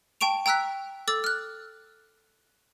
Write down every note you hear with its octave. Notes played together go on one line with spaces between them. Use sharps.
G5 A5 C#6 D7 F7
G5 A#5 E6 F#6 B6
A4 D6 E6 A6
F6 F#6